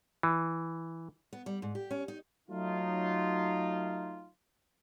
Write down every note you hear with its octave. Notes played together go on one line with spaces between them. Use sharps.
E3
B3
G3
G#2
G4
C#4
D#4
F#3 A3 D#4 F4